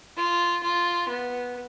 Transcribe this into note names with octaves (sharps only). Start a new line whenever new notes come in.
F4
F4
B3